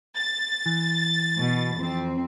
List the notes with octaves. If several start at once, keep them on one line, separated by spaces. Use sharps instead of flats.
A6
E3
B2
F2 C4